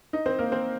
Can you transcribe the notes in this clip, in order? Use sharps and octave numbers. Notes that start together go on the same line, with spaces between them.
D#4 D#5
C4 C5
A#3 A#4
C4 C5